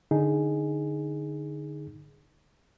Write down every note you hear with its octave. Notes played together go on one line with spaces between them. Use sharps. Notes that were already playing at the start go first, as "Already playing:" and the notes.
D3 D#4 G#4